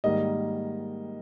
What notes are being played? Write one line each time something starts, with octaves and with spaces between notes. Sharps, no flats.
G#2 D#3 G3 A#3 D#5